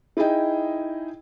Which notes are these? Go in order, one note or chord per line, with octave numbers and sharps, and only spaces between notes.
D#4 E4 G#4 D#5 G5